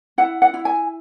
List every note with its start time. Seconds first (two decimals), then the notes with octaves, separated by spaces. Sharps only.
0.18 E4 F#5
0.42 F#5
0.54 E4
0.65 G#5